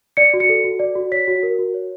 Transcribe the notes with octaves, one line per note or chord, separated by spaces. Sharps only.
D5 C#7
F#4
C#7
A4
F#4
D5
F#4
C#5 B6
F#4
A#4
F#4
C#5